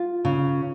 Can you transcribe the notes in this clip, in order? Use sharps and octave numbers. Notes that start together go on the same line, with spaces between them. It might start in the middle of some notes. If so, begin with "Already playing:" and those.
Already playing: F4
C#3